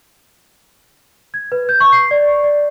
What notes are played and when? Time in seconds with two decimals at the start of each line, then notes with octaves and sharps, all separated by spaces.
1.34 G#6
1.52 B4
1.69 G6
1.80 C#6
1.92 C7
2.11 D5
2.43 D5